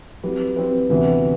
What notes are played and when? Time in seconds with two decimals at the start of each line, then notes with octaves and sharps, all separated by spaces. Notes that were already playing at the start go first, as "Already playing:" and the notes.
0.23 F#3 C4 E4 G4 B4
0.56 F#3 C4 E4 G4 B4
0.90 D2 C3 E3 B3 F#4